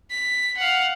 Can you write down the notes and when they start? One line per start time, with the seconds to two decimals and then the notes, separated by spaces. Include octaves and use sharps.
0.10 B6
0.57 F5 F#5